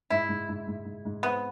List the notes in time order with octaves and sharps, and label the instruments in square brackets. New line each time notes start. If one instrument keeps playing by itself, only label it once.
[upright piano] G#2 [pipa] E4
[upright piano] G#2
G#2
G#2
G#2
G#2
[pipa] B3 [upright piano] C4